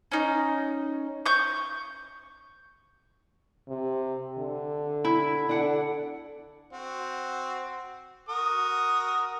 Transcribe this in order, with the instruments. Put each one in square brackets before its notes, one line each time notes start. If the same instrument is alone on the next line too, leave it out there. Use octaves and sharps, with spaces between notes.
[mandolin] C#4 D#4
C#6 G6
[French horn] C3
D3
[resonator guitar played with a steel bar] E4
[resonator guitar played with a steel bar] D4 F#5 [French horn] A4
[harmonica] C4 F#4
F#4 A#4 D#6